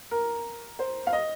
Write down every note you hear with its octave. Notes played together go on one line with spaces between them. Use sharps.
A#4
C5
F5
D#5